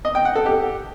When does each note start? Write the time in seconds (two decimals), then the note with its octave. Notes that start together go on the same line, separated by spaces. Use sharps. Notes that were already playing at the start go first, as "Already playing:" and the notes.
0.05 D#5
0.15 G5
0.25 F#5
0.36 A4
0.46 G4